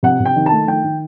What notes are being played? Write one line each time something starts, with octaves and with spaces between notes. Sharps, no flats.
C3 F#5
C3
G5
D#3
A5
A3
D#3 G5
D#3